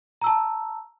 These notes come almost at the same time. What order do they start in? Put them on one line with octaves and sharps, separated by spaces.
A#5 E6 A5